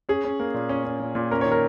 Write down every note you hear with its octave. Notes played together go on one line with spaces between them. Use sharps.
C#4 G#4
C#4
A#3
A#2
C#4
C#4
A#2
A#2
C#4 A#4
D#3 C#5
A#4